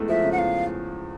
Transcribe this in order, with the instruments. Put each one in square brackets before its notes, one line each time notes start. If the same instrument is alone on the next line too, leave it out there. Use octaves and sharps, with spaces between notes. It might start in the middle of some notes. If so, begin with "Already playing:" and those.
Already playing: [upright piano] E2 G#3 A3
[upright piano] F3 [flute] E5
[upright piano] C#3
[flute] F#5
[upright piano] E2 [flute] F5